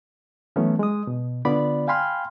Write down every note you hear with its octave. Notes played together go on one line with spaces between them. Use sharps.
E3 F#3 A3 B3 C#4
G#3 D#6
B2
D3 B3 F4 D5 B5
F5 G5 G#5 B5 C6 F6